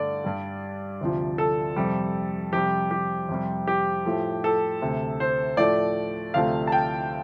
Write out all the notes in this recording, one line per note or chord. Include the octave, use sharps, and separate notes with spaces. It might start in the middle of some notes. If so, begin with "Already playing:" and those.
Already playing: G2 D3 A3 D5
G2 G3
D2 C3 F3
A4
F2 C3 G3
F2 C3 G3 G4
G4
F2 C3 G3
G4
A2 F3 A3
A4
D2 C3 A3
C5
A2 F3 A3 D5
D2 C3 F3 A3 F5
A5
G5